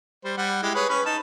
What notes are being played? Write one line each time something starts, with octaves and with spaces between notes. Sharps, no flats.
G3 C5
G3 F#5
G#3 E4 G4
G#4 B4 C#5
C#4 B4
D#4 A5 B5